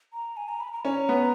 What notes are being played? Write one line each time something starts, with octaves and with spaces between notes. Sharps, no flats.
A#5
G#5
A#5
B5
A#5
C#4 A#5
B3